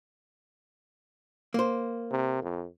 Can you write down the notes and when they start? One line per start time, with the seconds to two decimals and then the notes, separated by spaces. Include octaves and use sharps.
1.54 A#3 C5
2.11 C3
2.42 F2